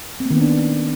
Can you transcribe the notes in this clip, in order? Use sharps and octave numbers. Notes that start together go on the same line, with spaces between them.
C4
A#3
D#3
B3
D4